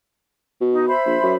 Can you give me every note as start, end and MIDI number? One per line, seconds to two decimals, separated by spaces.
0.61 0.90 47
0.73 0.85 63
0.88 1.36 72
0.88 1.36 76
0.88 1.36 83
1.06 1.17 34
1.23 1.36 42